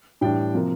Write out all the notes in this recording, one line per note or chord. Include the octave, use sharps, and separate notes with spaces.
A2 E3 G3 D4 G5
C3 F3 A#3